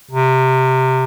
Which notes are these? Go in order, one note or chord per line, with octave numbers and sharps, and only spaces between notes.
C3